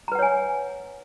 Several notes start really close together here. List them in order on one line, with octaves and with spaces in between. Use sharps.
A#5 B4 F#5 C#5 G#5